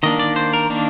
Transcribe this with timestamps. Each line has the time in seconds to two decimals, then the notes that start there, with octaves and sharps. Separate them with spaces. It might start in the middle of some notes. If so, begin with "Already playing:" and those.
0.03 D#3 A#3 D4 D#5
0.19 D5
0.36 C5
0.53 A#4
0.70 D#3 A#3 D4